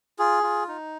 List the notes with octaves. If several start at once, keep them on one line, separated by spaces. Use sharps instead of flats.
F4 G#4
F4
D#4